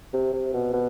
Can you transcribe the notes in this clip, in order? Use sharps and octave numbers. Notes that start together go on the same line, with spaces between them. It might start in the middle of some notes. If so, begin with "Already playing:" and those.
C3
C3
B2
B2